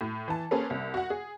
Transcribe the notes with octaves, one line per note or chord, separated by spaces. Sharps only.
A2
E3 A5
A#3 C#4 G#4 A4 B4 C5
C2
F#4 F#5
G#4